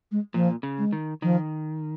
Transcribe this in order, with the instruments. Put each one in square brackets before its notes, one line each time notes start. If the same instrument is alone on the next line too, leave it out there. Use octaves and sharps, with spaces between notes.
[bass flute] G#3
[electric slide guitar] A#2 [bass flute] F3
[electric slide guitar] C#3
[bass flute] G#3
[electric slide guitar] D#3
[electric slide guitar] D#3 [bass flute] F3